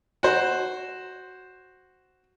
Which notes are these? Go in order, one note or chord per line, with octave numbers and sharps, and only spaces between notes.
F#4 C5